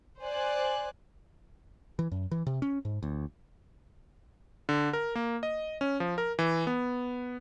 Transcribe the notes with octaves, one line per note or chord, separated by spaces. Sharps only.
C5 D5 G#5 F#6
E3
F#2
E3
C3
C#4
G#2
D2
D3
A#4
A#3
D#5
C#4
F3
A#4
E3
B3